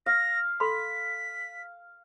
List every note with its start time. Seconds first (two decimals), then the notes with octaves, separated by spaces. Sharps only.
0.06 F5 A#6
0.60 A4 B5 C6 B6